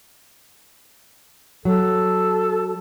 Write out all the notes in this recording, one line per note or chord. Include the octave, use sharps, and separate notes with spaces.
F#3 A4